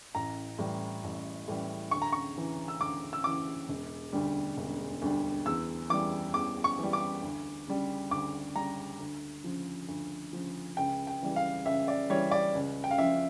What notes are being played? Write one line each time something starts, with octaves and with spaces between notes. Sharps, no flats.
A1 A#5
A2 E3 G3
A1
A2 E3 G3
D2 C#6
A#5
C#6
C#3 E3
E6
D2 D6
E6
C#3 E3 D6
E1
D2 D3 G3
E1
D2 D3 G3
E2 E6
E3 G3 D6
E2 D6
C#6
E3 G3
D6
D2
C#3 G3
D2 D6
C#3 G3 A#5
D2
C#3 F3
D2
C#3 F3
C#2 G5
G5
C#3 E3 G3
F5
C#2 E5
D5
C#3 E3 G3 C#5
D5
C#2
G5
F5
C#3 F3 E5